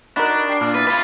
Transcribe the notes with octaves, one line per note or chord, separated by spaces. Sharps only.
D4 D#4 F#4 A#4 F#5 B5
G4 D6 C7
A#2 A5 F6
B3 E4 B4 F6 A6
F4 B4 G#5 B5